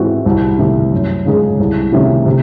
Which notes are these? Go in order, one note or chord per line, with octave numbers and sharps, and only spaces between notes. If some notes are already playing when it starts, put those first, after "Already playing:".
Already playing: G#2 E3 G#3 C4 F#4
C2
C3 D#3 A3
F#2
C#3 G#3 D#4 G#4
C2
C3 D#3 A3 C#4
C3